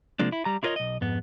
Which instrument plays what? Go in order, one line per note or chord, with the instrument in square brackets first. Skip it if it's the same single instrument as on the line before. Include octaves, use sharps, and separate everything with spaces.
[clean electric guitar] C3 F3 G#3 A#3 D4
E4
G3 A#5
E4 F4 A#4 C#5 D#5
B1 D#5
F2 G#2 B3